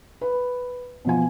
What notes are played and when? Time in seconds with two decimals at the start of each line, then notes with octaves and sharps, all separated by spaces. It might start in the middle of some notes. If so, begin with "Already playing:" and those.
0.21 B4
1.05 B2 F3 G#5